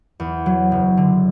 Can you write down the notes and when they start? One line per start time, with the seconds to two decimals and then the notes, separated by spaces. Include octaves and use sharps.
0.20 E2
0.46 F#3
0.72 F#1
0.97 D3